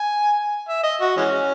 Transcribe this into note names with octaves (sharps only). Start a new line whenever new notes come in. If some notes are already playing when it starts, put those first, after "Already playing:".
Already playing: G#5
E5
D#5
F#4
E3 G#3 C#4